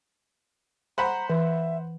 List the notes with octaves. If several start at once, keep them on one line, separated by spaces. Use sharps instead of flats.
C5 F#5 A#5 B5
E3 E5